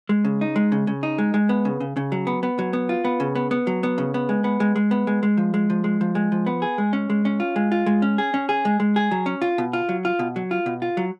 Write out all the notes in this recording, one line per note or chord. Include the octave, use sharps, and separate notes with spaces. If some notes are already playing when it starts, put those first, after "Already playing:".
G#3
C#3
D#4
G#3
C#3
C#3
D#4
G#3
G#3
B3
C#3
C#3
C#3
F#3
B3
B3
F#3
B3
F4
B3
C#3
B3
B3
F#3
B3
C#3
B3
G#3
B3
G#3
G#3
B3
G#3
G#3
F3
G#3
F3
G#3
F3
G#3
F3
B3
G#4
G#3
C#4
G#3
C#4
F4
G#3
F4
G#3
C#4
G#4
C#4
G#4
G#3
G#3
G#4
F#3
C#4
F4
B2
F4
F#3
F4
B2
F#3
F4
B2
F4
F#3